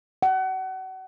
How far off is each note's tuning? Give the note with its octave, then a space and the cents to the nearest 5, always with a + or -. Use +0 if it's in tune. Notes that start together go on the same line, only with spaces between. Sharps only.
F#5 +30